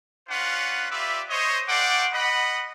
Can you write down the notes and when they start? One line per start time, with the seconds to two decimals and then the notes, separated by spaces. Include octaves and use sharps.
0.29 C#4 D4 F4 B4 F#5
0.91 F4 G4 B4 D5 E5
1.29 C5 C#5 D#5
1.68 A3 D5 F#5 G5 C6 D6
2.14 D#5 F#5 B5